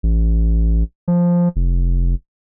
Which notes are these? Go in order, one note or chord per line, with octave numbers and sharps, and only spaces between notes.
A1
F3
F1